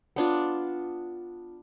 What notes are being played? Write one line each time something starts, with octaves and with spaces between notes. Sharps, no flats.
B3 D4 F4